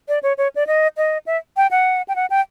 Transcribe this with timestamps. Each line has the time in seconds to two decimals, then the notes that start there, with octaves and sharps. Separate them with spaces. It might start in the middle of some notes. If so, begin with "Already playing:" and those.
0.08 D5
0.23 C#5
0.38 C#5
0.56 D5
0.67 D#5
0.97 D#5
1.26 E5
1.57 G5
1.71 F#5
2.08 G5
2.16 F#5
2.30 G5